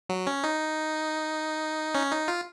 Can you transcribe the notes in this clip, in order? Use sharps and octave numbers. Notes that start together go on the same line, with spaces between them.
F#3
C#4
D#4
C#4
D#4
F4